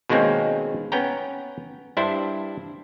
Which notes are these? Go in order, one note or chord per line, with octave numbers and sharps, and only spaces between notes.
B2 D#3 G#3 A#3 C4 C#4
B3 C#4 G5 A#5
G2 D4 E4 C5